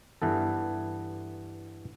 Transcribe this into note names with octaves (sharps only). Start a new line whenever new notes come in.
G2 E3 B3 A4